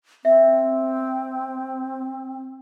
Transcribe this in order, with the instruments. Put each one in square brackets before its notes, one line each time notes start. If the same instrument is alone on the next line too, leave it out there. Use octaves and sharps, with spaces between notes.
[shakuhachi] C4 [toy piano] E5